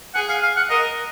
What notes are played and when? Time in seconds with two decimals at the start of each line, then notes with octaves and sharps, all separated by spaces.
0.15 G#4 F#5
0.29 F5
0.43 F5
0.57 F#5
0.70 A#4 D#5